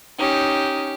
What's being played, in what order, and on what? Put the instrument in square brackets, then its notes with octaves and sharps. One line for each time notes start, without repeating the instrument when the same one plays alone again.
[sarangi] C#4 [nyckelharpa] D#4 [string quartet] G4